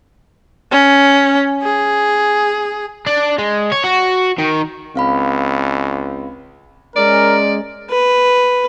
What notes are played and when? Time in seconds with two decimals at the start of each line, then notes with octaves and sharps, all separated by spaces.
0.71 C#4
1.63 G#4
3.07 D4
3.39 G#3
3.72 C#5
3.84 F#4
4.39 D#3
4.95 C#2 C4 F5 B5
6.96 G#3 C#4 A#4 D5
7.90 B4